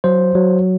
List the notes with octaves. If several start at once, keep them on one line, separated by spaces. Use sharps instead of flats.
F#3 C5
F#3